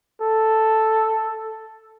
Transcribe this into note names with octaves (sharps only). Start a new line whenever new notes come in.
A4